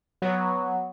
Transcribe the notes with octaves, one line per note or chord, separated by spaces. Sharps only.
F#3 B3 F#4